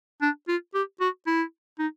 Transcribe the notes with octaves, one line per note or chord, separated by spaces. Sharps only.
D4
F4
G4
F#4
E4
D#4